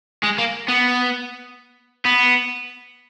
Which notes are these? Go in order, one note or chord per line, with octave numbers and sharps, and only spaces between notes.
G#3
A#3
B3
B3